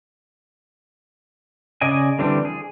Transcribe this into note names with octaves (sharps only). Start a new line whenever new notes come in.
C#3 D5 D#5 G#5
D3 E3 G3 C4 D4
G#4